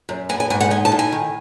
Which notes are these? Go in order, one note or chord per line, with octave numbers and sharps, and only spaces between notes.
F#2
B3 G#5
G#5
G#2 G#5
F#5
D#4 G#5
A5
A2
G#5
D#3